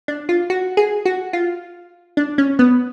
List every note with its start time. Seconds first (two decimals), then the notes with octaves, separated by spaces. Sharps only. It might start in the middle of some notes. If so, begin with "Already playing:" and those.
0.08 D4
0.29 F4
0.50 F#4
0.77 G#4
1.06 F#4
1.33 F4
2.17 D4
2.38 C#4
2.59 B3